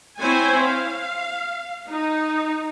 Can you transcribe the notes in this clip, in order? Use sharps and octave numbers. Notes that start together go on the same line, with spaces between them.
C4 E4 C5 C#5 G#5
F5
D#4